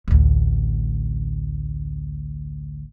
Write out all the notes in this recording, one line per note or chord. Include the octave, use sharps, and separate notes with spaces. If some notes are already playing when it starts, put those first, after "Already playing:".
A1 D2